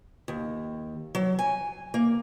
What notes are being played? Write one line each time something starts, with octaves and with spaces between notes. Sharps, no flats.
D#2
F#3
G#5
A#3